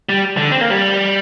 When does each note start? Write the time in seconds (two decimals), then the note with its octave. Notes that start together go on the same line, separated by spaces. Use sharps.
0.09 G3
0.37 D3
0.52 C4
0.61 A#3
0.70 G3